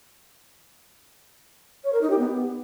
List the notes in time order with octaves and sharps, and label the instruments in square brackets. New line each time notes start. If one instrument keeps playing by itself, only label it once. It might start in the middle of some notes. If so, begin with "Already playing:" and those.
[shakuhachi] C#5
A#4
D#4
G4
B3